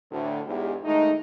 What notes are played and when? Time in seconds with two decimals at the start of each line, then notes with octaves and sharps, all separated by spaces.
0.12 D2 A2 D3
0.46 E2 G#2 G4
0.85 D#3 G#3 A3 D#4